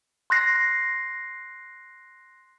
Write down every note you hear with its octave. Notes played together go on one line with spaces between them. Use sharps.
C6 F#6 A#6 C7